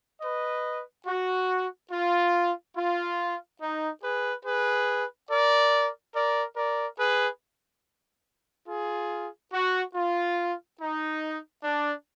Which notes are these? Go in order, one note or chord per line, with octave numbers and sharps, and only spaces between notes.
B4 D#5
F#4
F4
F4
D#4
G#4 B4
G#4 B4
A#4 D5
A#4 D5
A#4 D5
G#4 B4
F4 G#4
F#4
F4
D#4
D4